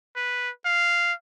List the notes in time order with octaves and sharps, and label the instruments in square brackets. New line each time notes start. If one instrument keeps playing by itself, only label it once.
[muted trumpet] B4
F5